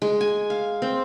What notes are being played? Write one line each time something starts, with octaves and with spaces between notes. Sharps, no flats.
G#3
G#5
F5
C4